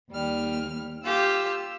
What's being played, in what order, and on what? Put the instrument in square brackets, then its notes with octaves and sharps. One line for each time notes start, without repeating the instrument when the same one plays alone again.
[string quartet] D#2 G3 F6
[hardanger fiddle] F4 G4 [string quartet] E6